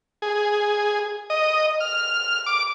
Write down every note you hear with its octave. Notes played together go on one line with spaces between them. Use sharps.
G#4
D#5
F6
D6